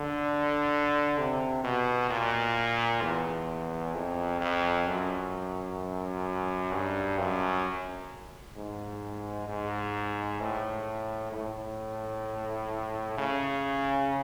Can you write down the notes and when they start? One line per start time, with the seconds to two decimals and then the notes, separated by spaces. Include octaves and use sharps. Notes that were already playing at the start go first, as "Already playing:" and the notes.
Already playing: D3
1.18 C3
1.64 B2
2.10 A#2
3.02 E2
3.94 F2
4.41 F2
4.87 F#2
6.72 G2
7.18 F#2
8.56 G#2
9.48 G#2
10.41 A2
11.33 A2
13.18 C#3